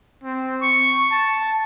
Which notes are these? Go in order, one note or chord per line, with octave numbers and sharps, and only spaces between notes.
C4
C#6
A5